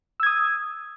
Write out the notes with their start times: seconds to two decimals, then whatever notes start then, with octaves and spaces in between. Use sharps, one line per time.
0.20 E6
0.23 G#6
0.27 D#6